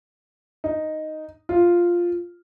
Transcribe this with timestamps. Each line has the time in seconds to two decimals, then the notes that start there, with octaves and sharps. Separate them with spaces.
0.64 D#4
1.49 F4